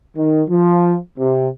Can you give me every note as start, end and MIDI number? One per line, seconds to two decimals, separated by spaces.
0.16 0.43 51
0.48 0.97 53
1.18 1.48 48